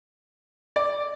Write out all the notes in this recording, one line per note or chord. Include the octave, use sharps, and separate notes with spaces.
D5